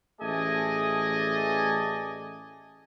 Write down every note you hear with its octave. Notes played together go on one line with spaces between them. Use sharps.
A1 A3 G#4 D5 D#5 G#5